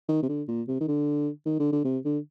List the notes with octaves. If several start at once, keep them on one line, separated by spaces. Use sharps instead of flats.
D#3
C3
D3
A#2
C3
D#3
D3
D#3
D3
D3
C3
D3